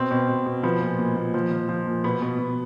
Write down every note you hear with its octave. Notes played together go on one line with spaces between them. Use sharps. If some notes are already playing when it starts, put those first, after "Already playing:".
Already playing: B2 C4
B2
B2
B2
F3 B3
A#2
A#2
A#2
F3
F3
F3
A#2
B2 B3
B2
B2